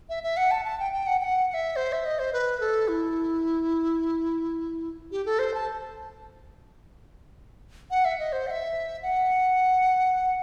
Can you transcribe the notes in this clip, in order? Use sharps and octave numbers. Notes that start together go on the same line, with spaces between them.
E5
E5
F#5
A5
A5
G5
G5
F#5
G5
F#5
F#5
E5
C5
E5
D#5
C5
B4
A4
E4
G4
A4
C5
A5
F#5
E5
D#5
C5
F#5
E5
F#5